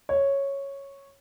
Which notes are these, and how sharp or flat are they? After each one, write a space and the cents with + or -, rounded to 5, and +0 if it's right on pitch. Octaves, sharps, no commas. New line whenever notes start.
C#5 -5